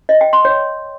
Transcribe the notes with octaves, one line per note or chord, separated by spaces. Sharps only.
D#5
G5
C6
C#5